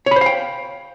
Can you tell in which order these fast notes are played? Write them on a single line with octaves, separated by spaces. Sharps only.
C#5 B5 C5 F5 G5